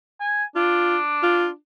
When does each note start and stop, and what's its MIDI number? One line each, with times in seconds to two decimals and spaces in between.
0.20 0.44 80
0.56 1.54 62
0.56 0.97 65
1.23 1.48 65